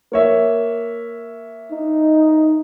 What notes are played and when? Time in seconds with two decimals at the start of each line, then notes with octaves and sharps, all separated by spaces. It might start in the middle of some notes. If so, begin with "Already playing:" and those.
0.12 A#3 C#5 E5
1.72 D#4